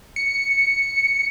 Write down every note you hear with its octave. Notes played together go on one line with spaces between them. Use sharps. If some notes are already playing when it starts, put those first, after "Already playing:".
C#7